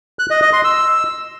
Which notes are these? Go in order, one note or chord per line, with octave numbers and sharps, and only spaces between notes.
F#6
D#5
D#5
C6
E6